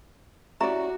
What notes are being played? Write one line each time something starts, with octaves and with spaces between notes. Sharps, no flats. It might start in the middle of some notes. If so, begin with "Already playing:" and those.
C#4 E4 F#4 G4 D5 E5 A#5